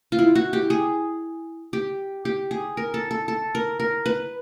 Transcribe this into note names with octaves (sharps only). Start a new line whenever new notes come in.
F4
E4
F#4
G4
G#4
G4
G4
G#4
A#4
A4
A4
A4
A#4
A#4
B4